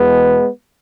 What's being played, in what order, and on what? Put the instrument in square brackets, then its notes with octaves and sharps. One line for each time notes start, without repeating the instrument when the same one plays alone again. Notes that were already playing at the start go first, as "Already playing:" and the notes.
Already playing: [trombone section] E2 B2 G#3 B3